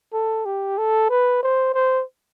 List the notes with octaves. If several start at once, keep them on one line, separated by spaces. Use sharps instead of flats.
A4
G4
A4
B4
C5
C5